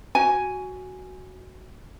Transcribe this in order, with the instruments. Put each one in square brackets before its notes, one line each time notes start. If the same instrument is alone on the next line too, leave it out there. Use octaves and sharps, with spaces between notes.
[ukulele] F#4 G#5